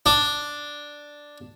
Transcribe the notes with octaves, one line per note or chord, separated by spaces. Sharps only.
D4